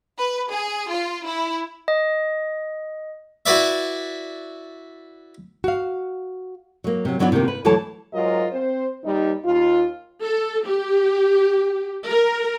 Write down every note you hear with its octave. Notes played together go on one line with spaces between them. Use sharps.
B4
G#4
F4
E4
D#5
E4 F#4 B4 D5 E5
F#4 F5
F#3 A#3
C3 F#3
E3 F#3 B3 D4 D#4 F#4
C3 D#3 F3 A#3
B4
D2 E3 F#3 A4 C#5 A5
G#2 F#3 F4 A#4 D#5
C4 C5
D#2 G3 D#4
D#2 F4
A4
G4
A#4